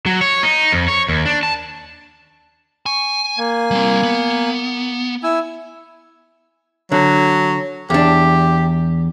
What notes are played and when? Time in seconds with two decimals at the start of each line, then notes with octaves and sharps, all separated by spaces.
0.06 F#3
0.21 C#5
0.43 D#4
0.72 F2
0.88 C#5
1.08 D#2
1.25 D4
1.43 A5
2.86 G#5 C#6
3.38 A#3 G#5
3.71 G3 C4
4.03 B3
5.23 E4 G#5 E6
6.92 D3 F#3
7.90 E2 D4 G4